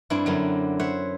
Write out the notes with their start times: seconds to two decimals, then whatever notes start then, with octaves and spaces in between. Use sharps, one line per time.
0.10 G2 C4 D4 E4
0.26 F#2 D3 F#3
0.80 C5 C#5 E5 F#5